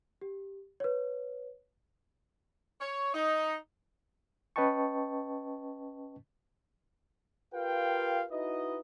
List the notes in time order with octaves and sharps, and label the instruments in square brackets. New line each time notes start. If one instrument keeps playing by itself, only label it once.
[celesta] G4
B4 C#5
[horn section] C#5
D#4
[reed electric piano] C#4 B4 D#5 G5 A5 C#6
[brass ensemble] F4 G4 A#4 B4 F5 G5
D#4 E4 F#4 B4 D#5